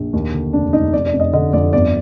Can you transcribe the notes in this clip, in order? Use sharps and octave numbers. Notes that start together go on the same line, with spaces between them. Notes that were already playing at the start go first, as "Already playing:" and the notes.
Already playing: A#1
D#2
D3
F1 D4
F1 D#4
F1 D5
D5
F1
D#5
D3 D#5
F2 D5
G1 D5